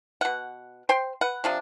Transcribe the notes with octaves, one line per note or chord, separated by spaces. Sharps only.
B2 F#5
C5 G5 C6
B4 F#5
C3 F3 D4